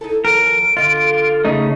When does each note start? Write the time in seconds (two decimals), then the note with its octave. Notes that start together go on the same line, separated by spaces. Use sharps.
0.01 D#4 E4 A4
0.25 D#2 F3 A#4 B4 D7
0.77 D3 F4 D#5
1.45 C#3 A3 D#4